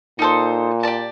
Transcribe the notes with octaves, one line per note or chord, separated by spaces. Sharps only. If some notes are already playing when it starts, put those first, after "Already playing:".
A#2 D#4 A4 C5
G4 D5 A5